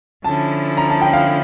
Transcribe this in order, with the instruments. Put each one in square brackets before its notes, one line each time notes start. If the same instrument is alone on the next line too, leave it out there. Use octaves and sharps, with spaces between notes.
[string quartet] D3 F3 C#4 E4 [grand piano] A5
[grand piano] A#5
A5
G5
F5